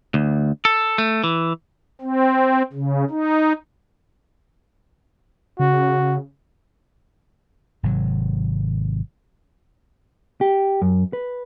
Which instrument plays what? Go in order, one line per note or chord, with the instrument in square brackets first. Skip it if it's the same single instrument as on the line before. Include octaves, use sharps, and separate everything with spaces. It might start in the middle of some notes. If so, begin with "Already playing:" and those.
[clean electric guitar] D2
A4
A3
E3
[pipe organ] C4
C#3
D#4
[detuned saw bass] C#3 [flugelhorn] F#4
[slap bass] G#1 C3 F#3
[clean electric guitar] G4
F#2
B4